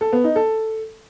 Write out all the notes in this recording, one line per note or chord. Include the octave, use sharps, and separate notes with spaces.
A4
B3
D#4
A4